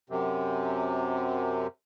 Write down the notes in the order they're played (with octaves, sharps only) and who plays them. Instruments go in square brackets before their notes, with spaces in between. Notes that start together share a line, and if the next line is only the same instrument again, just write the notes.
[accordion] F#2 C3